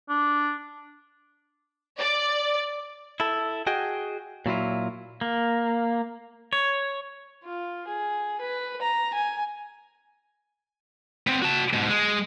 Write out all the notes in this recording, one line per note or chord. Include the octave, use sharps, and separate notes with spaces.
D4
D5
E4 A4
F#4 G#4 D#5 G5
A#2 F#3 E4 F4
A#3
C#5
F4
G#4
B4
A#5
G#5
B3 C4
F#4 A5
G#2 B2
G#3